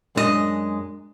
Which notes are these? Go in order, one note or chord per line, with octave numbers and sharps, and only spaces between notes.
F#2 G#3 D4 E4 D#5